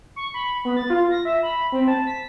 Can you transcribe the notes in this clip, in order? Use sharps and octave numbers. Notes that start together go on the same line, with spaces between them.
C#6
B5
B3
A6
F4
A#6
E5
B5
C4
A5
B6